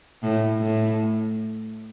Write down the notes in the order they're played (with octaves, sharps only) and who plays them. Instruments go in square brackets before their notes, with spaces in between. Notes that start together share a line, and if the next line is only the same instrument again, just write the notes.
[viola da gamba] A2
A2